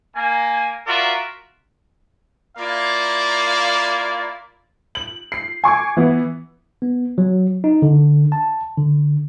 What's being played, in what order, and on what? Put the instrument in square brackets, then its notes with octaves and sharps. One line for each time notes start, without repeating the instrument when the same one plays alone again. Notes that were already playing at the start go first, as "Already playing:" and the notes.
[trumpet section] A#3 G#5
F4 F#4 A#4 D5 E5
A#3 E4 F4 D5 F5
[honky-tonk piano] F#7
C7
G#5 C#6 D6 G#6
E3 B3
[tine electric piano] B3
F#3
D#4
D3
A5
D3